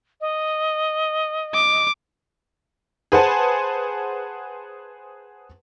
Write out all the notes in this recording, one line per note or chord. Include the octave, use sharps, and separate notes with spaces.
D#5
D6
G#4 B4 C5 F#5 G#5 A5